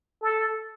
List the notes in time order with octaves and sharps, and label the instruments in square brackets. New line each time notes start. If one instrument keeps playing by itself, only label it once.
[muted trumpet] A4